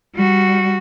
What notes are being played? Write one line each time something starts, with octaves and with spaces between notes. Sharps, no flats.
G3 F#4